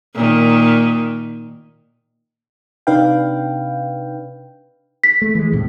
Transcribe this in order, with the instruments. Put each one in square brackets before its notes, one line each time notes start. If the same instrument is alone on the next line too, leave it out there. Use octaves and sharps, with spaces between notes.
[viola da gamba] A#2 D#3
[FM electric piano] C3 D4 D#4 B4 F5 G5
[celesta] B6
[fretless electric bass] A3
E3 G#3
D#1 A2 C3